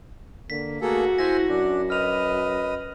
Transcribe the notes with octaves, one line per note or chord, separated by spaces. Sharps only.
D3 A#3 B6
A3 A#3 F#4 G#4 A4
E4 C5 E5 G#5 A#6
F#2 D4
B4 D#5 F6 F7